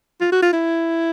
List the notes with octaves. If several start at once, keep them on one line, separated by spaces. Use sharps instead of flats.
F4
F#4
F4
E4